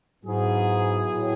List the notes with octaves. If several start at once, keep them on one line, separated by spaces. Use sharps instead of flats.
G#2 F#3 B3 E4 G#4
A2